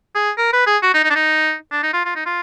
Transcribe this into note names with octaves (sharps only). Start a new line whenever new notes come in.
G#4
A#4
B4
G#4
F#4
D#4
D#4
D4
D#4
D4
D#4
F4
F4
D#4
F4